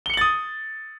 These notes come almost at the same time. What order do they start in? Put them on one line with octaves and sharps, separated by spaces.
G7 C#7 F#7 A6 D#6